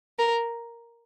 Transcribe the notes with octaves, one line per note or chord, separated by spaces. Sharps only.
A#4